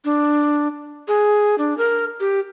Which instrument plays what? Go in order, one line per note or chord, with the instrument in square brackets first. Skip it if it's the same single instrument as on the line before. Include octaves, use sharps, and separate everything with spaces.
[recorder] D4
G#4
D4
A#4
G4